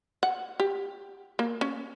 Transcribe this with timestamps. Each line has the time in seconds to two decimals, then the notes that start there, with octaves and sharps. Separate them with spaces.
0.23 F#5
0.60 G4
1.39 A#3
1.61 C#4